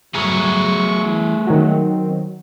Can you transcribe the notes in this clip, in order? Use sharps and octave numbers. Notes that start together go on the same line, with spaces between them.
F#3 A3 G#4 A#5 C#6
E3
D#3 F#3 C4